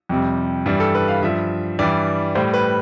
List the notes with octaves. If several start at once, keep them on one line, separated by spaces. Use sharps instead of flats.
F2 C3 G3
G2 E3 G3
A4
B4
F5
G2 F3 E5
G2 E3 G3 D5
A2 G3 C5
B4